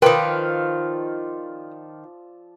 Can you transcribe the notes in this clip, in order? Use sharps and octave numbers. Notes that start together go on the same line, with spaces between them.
D#3 F3 F4 A#4 B4 D5 E5 G5